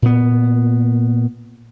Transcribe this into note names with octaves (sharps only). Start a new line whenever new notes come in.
A#2 B3